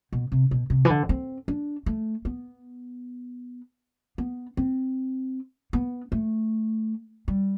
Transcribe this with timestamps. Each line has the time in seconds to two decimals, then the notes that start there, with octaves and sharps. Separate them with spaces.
0.13 B2
0.32 C3
0.51 B2
0.70 C3
0.85 E3
0.90 D3
1.09 C4
1.48 D4
1.86 A3
2.25 B3
4.18 B3
4.57 C4
5.73 B3
6.12 A3
7.28 G3